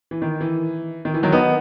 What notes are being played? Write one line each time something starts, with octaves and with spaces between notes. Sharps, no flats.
E3
D#3
E3
D#3
E3
D#3 F#3
B3 D#4